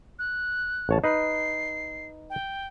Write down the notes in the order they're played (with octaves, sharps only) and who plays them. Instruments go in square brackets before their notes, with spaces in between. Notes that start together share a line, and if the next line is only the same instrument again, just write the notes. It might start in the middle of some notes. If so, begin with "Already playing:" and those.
[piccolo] F#6
[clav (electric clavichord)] A1 C#5 A5
[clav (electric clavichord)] D#4 B4 [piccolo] C7
[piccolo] G5